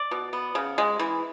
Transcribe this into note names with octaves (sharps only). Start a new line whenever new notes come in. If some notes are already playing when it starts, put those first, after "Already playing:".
Already playing: D5
B2
B3
C#3
G#3
E3